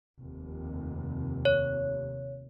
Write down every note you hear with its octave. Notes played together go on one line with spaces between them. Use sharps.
F1 D#2 C3
C#5